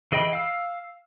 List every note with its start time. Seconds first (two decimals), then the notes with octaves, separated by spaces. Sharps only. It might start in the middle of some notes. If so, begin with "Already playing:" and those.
0.12 E3 G#4 D#5 G5 B5
0.33 F5 E6